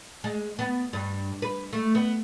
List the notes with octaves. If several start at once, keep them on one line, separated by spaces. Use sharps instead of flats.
G#3
B3
G2
B4
A3
B3